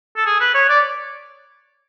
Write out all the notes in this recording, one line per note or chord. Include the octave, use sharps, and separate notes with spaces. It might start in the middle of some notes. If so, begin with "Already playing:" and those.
A4
G#4
B4
C#5
D5